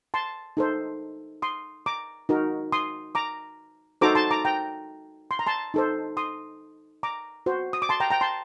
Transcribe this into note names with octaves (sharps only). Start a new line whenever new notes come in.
A5 C6
D#4 A4 C5
C6 D#6
A#5 D6
D#4 F#4 A#4
C6 D#6
A#5 D6
D#4 F#4 A4 C5 A#5 D6
A5 C6
A#5 D6
G5 A#5
C6
A#5
A5 C6
D#4 A4 C5
C6 D#6
A#5 D6
F#4 C5
D#6
D6
A5 C6
G5 A#5
G5 A#5
A5 C6